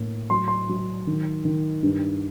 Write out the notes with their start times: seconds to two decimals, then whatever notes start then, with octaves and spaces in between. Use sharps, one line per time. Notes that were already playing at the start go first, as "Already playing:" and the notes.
Already playing: A2 A#3
0.30 F#3 C6
0.48 C6
0.69 F#3
1.07 D#3
1.45 D#3
1.83 G2